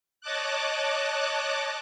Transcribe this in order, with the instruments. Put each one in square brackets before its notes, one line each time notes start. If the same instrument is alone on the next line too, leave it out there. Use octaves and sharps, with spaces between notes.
[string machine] C#5 D#5 A5 D6 F#6